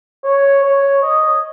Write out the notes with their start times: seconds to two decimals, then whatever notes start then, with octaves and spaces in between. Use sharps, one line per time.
0.24 C#5
0.64 C#5
1.03 D#5